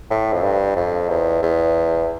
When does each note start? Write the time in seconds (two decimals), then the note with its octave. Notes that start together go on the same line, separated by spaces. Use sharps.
0.10 A2
0.33 F2
0.43 G2
0.76 F2
1.09 E2
1.42 E2